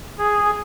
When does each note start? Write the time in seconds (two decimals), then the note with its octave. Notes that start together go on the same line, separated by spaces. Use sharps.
0.18 G#4